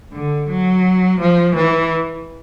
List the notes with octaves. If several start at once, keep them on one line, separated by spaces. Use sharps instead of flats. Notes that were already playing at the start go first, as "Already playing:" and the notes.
D3
F#3
F3
E3